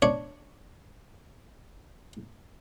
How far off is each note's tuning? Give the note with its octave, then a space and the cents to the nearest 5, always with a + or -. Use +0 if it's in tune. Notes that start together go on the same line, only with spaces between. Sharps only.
D4 +0 C#5 +0